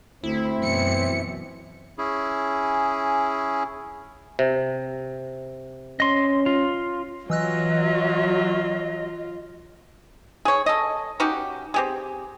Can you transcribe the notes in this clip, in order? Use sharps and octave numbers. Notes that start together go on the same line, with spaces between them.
D2 C4 E4
F#2 B2 E3 C#7
C#4 E4 G#4
C3
C#4 D#5 C6
F4
E3 F#3 F4 D#5 E6 F#6
G#4 C#5
A4 D#5
C#4 D#4 F#4 G4
C4 G4 G#4